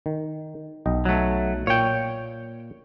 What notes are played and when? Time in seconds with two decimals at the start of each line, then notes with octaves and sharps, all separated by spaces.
0.06 D#3
0.86 B1 D#5 G5
1.05 F#3 A3
1.67 A#2 C#5 F5 G5